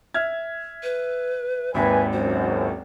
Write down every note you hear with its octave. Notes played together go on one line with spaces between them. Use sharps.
E5 F6 G#6
B4
G#1 D#2 B4 E5 G#5
C#2 F#2 C5